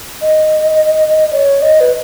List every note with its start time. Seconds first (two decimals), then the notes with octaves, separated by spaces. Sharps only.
0.21 D#5
1.33 C#5
1.62 D#5
1.80 B4